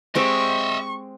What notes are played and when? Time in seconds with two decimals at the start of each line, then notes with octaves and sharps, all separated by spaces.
0.15 G#3 C4 G4 D#5 E5 C#6